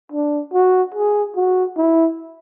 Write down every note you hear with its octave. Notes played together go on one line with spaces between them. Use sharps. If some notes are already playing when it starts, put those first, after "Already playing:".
D4
F#4
G#4
F#4
E4